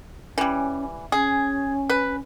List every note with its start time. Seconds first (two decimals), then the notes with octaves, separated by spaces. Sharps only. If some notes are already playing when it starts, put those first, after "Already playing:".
0.38 E3 G3 C#4
1.12 C#4 G#4
1.90 B4